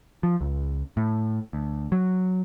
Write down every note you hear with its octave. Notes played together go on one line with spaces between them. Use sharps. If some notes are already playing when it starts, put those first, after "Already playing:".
F3
C#2
A2
D2
F#3